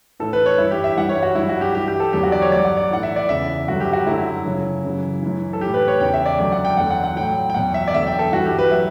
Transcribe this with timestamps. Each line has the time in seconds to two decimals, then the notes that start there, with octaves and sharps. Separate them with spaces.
0.20 A2 E3 A4
0.33 B4
0.46 C#5
0.58 G2 E3 E4
0.71 G4
0.84 E5
0.97 G2 E3 F#5
1.09 C#5
1.23 F#4
1.35 G2 F#3 E4
1.49 F#4
1.61 G4
1.75 G2 E3 G4
1.88 G4
2.00 A4
2.13 E2 D3 F#3 G4
2.23 F#4
2.32 D5
2.42 C#5
2.51 G2 F#3 D5
2.65 F#5
2.77 D5
2.91 A2 E3 F#5
3.03 E5
3.16 D5
3.29 E2 C#3 E3 E5
3.68 G2 D3 F#3 F#4
3.80 G4
3.93 F#4
4.06 F#2 D3 F#3 E4
4.45 F#2 C#3 F#3
4.85 F#2 C#3 E3
5.23 F#2 E3
5.53 A4
5.61 A2 E3 G4
5.74 B4
5.88 C#5
6.00 E2 C#3 E3 G5
6.14 E5
6.26 D5
6.39 F#2 D3 F#3 D5
6.52 F#5
6.65 G5
6.77 E2 D3 F#3 F#5
6.91 F#5
7.04 F#5
7.16 A2 F#3 G5
7.50 G5
7.54 E2 B2 F#3 F#5
7.74 E5
7.88 D5
7.93 E2 D3 F#3 E5
8.07 G5
8.19 A4
8.32 G2 E3 F#4
8.45 G4
8.59 B4
8.71 F#3 E5